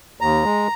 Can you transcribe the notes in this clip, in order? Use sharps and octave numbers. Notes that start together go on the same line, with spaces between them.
D#2 A#5
G#3